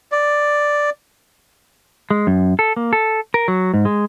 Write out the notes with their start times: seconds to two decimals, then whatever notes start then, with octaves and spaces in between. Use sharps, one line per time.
0.12 D5
2.10 G#3
2.27 F#2
2.59 A4
2.76 A#3
2.93 A4
3.34 A#4
3.48 F#3
3.74 G#2
3.85 G#3